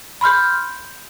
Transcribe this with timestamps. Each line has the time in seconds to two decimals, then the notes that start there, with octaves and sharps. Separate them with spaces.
0.21 B5 C6 F6 G6